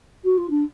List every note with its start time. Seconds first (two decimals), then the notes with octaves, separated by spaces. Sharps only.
0.24 F#4
0.37 F4
0.50 D4